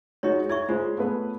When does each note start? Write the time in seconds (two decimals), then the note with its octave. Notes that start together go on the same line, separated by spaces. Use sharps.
0.23 G#3 D#4 F#4 C#5 D#5
0.49 E4 E5 C#6 G#6
0.69 G#3 F4 C5
0.98 A3 B3 B4